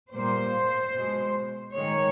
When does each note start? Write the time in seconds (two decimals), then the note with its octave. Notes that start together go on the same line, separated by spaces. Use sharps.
0.12 A#2 G3 A#3 C5
0.94 B2 G#3
1.74 D#3 G#3 C#5